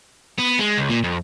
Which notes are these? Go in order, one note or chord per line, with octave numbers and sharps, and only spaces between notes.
B3
G#3
C#2
A#2
F2